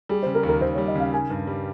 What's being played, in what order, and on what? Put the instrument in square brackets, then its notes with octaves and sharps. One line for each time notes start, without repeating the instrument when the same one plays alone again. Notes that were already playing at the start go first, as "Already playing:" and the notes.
[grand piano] G3 [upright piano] G#4
[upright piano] C5
[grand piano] C#3
[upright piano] A#4
[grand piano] D#2
[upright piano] A#4
[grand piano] D#2 [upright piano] C5
[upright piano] C#5
[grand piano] G3
[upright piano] D#5
[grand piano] C#3 [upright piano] F5
[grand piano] D#3 [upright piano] G#5
[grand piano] G2
G3